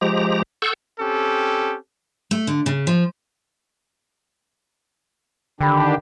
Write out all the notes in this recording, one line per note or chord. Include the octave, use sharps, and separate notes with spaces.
F3 G#3 G4 A#5
A4 F#5 C#6 E6 G6
C4 C#4 G4 A4
A3
D3
C#3
F3
D3 D#3 D4 G4 G5 B5